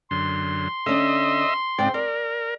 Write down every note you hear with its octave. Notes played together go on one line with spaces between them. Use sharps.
F#2 D3 C6
D3 C#4 D#5 E5
G#2 C#3 C4 D5 G5
A#4 D5